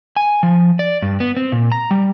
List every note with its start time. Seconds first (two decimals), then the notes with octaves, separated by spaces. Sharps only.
0.17 G#5
0.43 F3
0.79 D5
1.02 G2
1.20 B3
1.37 C4
1.52 A#2
1.72 A#5
1.91 G3